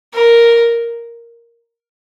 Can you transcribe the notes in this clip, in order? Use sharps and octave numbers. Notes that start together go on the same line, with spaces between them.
A#4